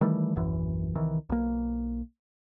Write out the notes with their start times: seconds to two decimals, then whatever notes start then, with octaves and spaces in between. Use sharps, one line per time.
0.01 D#3 E3 G3 A3
0.36 D#1 A#1 F#2 E3
0.95 C2 D#3 E3
1.29 B1 A#3